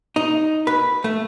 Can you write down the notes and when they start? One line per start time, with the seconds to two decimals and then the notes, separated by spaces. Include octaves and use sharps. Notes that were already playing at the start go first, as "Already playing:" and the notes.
0.16 D#4
0.67 B4
1.04 A3